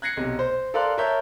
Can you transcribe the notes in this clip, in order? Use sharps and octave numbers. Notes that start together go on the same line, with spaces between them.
F#6 G#6 A#6 C7 C#7
B1 C3
C5
A4 A#4 D5 F5 C6 F#6
A#4 C#5 E5 A5 G6